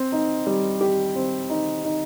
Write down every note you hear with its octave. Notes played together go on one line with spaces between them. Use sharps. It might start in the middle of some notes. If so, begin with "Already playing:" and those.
Already playing: C4
D#4
G3
G4
C4
D#4
D#4